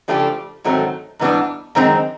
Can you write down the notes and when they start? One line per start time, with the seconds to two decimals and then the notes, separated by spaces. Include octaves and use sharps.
0.08 C#3 F3 A3 D4 G4
0.64 G#2 D#3 F#3 A3 C4
1.19 G#2 E3 G3 B3 D4
1.75 F#2 D#3 G#3 C4 D#4